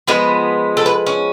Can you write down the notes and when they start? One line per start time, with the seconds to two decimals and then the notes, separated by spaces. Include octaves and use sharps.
0.07 F3 G#3 B3 B4
0.77 A4
0.86 B4
1.06 C#4